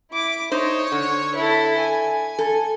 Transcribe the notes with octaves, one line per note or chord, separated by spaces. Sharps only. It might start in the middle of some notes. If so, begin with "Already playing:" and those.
E4 D6
D#4 C5 C#5
D3
E4 A4
G#5
A4